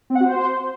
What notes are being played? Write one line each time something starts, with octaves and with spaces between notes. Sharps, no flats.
C4
F#5
F#4
C5